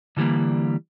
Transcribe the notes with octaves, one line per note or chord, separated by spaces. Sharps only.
D3 E3 G3 G#3 A#3